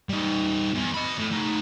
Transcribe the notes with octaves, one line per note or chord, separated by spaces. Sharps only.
G3 D#4
E2
D#5 B5
A2
A3 D#4